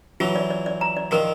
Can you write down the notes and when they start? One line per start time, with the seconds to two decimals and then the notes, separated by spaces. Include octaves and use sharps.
0.20 E3 F#3 F4
0.36 D5
0.50 D5
0.66 D5
0.81 A#5
0.97 D5
1.11 D#3 F3 A#4